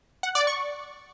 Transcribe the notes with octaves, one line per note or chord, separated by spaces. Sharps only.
F#5
D5
C#6